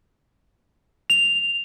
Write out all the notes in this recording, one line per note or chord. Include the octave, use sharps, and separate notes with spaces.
F7